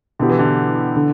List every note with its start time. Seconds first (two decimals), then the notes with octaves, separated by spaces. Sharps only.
0.19 B2 D3 B3 E4 G4
0.29 E3
0.39 D3
0.96 D3